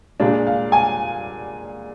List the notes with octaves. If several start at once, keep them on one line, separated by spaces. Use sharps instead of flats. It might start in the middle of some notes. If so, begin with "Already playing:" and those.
A#2 G#3 D4 F5
F5
G#5